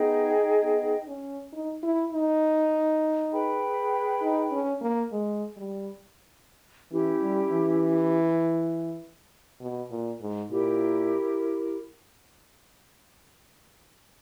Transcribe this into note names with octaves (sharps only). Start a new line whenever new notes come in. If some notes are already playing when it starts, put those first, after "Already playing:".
Already playing: B3 D#4 G#4 D#5 G5
B3
C#4
D#4
E4
D#4
G#4 B4 G5 B5
D#4
C#4
A#3
G#3
G3
E3 C#4 E4 G4
G3
E3
B2
A#2
G#2
A#2 E4 G4 A#4